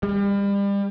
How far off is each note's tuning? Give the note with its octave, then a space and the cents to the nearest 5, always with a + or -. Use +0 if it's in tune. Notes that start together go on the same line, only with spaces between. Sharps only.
G3 +35